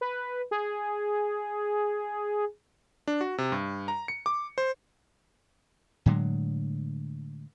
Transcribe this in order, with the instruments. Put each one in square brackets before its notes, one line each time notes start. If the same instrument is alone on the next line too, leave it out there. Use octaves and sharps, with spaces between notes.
[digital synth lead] B4
G#4
[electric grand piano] D4
F#4
C3
G2
A#5
C#7
D6
C5
[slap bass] A2 D3 F#3 G#3